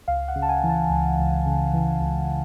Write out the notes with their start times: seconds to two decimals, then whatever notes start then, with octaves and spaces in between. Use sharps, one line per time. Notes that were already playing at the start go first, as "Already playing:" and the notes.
0.08 C#2 F5
0.28 F#5
0.35 C#3
0.42 A5
0.49 G#5
0.63 E3
0.69 A5
0.90 C#2
1.19 C#2
1.46 C#3
1.74 E3
2.01 C#2